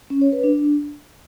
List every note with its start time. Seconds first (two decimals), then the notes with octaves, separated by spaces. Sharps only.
0.10 C#4
0.21 C#5
0.32 B4
0.44 D4